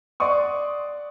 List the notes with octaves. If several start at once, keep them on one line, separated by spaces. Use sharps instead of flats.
D5 F#5 C6 C#6 D#6